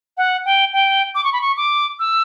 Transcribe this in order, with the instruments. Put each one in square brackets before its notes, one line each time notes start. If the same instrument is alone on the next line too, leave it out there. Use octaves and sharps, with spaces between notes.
[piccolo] F#5
G5
G5
D6
C#6
B5
C#6
D6
E6